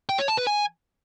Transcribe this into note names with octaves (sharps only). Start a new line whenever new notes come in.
G5
C#5
A5
B4
G#5